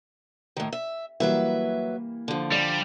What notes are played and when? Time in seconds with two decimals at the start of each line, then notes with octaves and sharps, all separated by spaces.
0.57 A2 D#3
0.72 E5
1.20 E3 F#3 G3 A#3 B4 E5
2.28 D3 F3
2.52 G3 D5